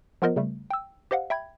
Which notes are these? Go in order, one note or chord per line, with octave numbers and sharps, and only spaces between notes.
F3 B3 F4 A#4 C5 D#5
C#3 G3 A3
G5 E6
G4 C5 D#5 F5 F#5
E5 G5 B5 G#6